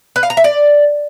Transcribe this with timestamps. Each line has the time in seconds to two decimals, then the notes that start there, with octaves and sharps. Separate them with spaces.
0.16 B4
0.23 F5
0.30 A#5
0.37 E5
0.44 D5